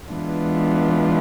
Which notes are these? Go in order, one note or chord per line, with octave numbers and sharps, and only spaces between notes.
E3 G#3 B3 D4 F4